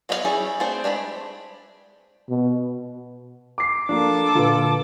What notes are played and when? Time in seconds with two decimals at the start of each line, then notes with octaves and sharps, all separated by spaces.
0.09 F#3 B3 F4 F#4 F5
0.25 G3 C#4 E4 F#4 G#4
0.60 A3 C4 D4 G#4 C5
0.84 G#3 D4 A#5 B5
2.29 B2
3.58 D6 C7
3.89 F3 A#3 D4 A4 D6
4.35 A#2 D3 F4 B4